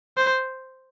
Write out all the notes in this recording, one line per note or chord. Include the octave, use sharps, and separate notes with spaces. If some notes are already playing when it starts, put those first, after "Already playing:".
C5